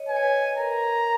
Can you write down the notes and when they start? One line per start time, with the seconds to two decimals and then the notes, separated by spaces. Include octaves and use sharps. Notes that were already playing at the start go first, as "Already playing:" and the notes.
Already playing: C#5 D#5
0.09 B4 G#5
0.16 C#5
0.23 B4
0.58 A#4 A#5
0.95 A#4